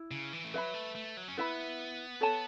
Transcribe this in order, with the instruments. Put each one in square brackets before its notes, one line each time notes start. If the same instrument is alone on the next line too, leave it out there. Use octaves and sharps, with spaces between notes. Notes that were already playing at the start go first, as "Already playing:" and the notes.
Already playing: [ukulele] E4
[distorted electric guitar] C#3
E3
A3
[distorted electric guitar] F#3 [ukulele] B4 E5 B5
[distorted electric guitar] A3
A3
F#3
C#4
[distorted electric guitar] B3 [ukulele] E4 B4 E5 B5
[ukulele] A4 C#5 A5